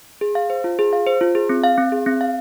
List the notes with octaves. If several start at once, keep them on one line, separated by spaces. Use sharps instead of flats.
G#4
F5
C5
F4
G#4
F5
C5
F4
G#4
C4
F5
C4
G#4
C4
F5